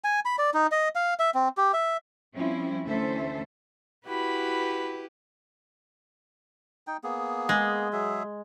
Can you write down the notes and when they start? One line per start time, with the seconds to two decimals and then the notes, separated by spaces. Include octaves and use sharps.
0.04 G#5
0.25 B5
0.38 D5
0.54 D#4
0.72 D#5
0.95 F5
1.19 E5
1.35 C4
1.57 G4
1.74 E5
2.35 F3 G3 C4 C#4 E4
2.87 D2 E3 C#4 A4 C5 E5
4.07 E4 F#4 G4 B4 B5
6.87 D#4 G5
7.04 A#3 B3 G#4
7.49 G#3
7.93 F#3 G#4 E5